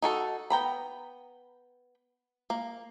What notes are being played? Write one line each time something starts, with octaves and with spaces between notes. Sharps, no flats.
D#4 F#4 A4
B3 G5 A#5 B5
A#3